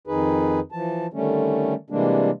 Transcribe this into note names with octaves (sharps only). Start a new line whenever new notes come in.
F2 D#3 D#4 G#4 B4
E3 F3 A5
D3 D#3 G3 A3 C#4
C3 E3 G3 G#3 A#3 D4